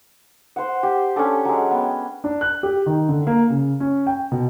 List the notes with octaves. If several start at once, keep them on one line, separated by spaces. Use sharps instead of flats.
C5 F#5
G4
C#4 D4 G4 A4
F#3 G#3
B3 G5
D4
F#6
G4
D#3
D3
A#3
C#3
C#4
G5
B2